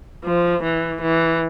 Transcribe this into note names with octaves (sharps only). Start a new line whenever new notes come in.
F3
E3
E3